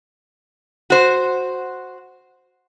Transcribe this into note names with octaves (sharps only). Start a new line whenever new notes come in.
F#4 C5